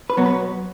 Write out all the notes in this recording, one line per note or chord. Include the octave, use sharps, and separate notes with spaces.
B4
B2 F#3 B3 A#4
B4